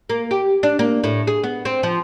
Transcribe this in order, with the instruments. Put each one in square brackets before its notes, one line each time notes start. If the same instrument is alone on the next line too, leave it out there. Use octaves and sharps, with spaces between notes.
[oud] A#3
G4
D4
A#3
A2
G#4
B3
C4
F3